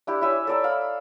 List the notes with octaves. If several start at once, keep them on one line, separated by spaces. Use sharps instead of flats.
D4 E4 G4
E4 C#5 E5 G#5
A4 D5 A#5
F5 B5